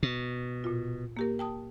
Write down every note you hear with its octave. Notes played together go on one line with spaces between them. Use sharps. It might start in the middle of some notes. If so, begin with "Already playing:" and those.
B2
A#2 F4
A#3 G4 A#4
G5 A5 D#6